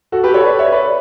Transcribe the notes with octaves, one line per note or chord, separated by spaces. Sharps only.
F#4 A4
G4 B4
A4 C#5
B4 D5
C#5 E5
B4 D5